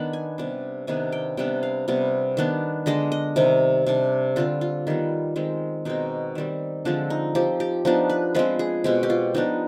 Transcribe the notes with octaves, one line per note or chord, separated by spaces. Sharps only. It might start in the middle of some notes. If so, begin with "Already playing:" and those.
Already playing: D#3 B3 D4 B5
G#5
C3 G3 B3 D4
C3 D#3 B3 D4 G#5
G5
C3 G3 B3 D4 G5
F5
C3 G3 B3
D#3 B3 D4
D3 G#3 D4 D#5
D#5
C3 D#3 G3 C4
C3 G3 D4
D3 G3 C4 F4
F4
D#3 G3 B3
D#3 G#3 C4
B2 G#3 C4 D#4
D#3 G3 C4
D3 F3 G#3 C4 D4
D#4
F3 C4 G4
G4
F3 B3 D4 D#4
B4
F3 G#3 C4 B4
G#4
B2 G#3 C4 G4
G4
F4
F3 B3 D4 D#4